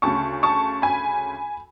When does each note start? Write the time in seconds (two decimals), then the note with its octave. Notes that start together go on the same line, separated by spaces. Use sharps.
0.02 D2 C#3 A5 C#6
0.43 A5 C#6
0.82 G#5 B5